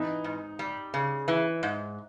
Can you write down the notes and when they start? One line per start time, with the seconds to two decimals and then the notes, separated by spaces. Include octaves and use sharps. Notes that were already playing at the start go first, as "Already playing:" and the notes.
Already playing: E3 D#4
0.24 G#2
0.59 G3
0.94 C#3
1.28 E3
1.63 G#2